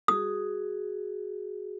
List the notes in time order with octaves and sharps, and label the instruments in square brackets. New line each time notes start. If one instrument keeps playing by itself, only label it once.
[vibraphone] F#4 G#4 [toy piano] D#6